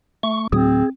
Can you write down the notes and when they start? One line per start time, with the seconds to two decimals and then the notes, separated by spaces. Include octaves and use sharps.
0.23 A3 C#6
0.52 D2 A2 F#3 C4 G#4